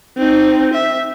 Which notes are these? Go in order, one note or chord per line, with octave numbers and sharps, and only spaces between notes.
C4 D#4
E5